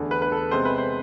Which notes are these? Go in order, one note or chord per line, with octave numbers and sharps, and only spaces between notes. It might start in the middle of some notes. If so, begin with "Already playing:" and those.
Already playing: E2 D3 A3
B4
B4
A4
C3 G#3 B3 C5
B4
C5